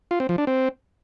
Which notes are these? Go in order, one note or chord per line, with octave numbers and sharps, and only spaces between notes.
F4
C4
F3
D4
C4